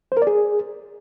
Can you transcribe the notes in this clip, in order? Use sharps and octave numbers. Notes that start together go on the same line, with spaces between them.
C5
A#4
D5
G#4